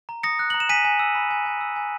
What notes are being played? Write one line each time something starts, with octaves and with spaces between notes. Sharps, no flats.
A#5
D#6 A#6 C#7
F#6
A#5 F#7
E7
G#5 B6 D#7
G#5
E6
B5
G#5
G#5
E6
G#5